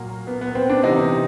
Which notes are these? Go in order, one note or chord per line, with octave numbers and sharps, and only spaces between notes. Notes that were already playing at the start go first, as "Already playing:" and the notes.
Already playing: A#2 F#3 A#3
B3
B3
C4
D4
C3 E3 D#4